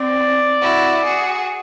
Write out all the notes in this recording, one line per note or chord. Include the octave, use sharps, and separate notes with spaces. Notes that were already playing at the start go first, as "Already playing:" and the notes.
Already playing: C4 D5
E4 F#4
F#4 G#4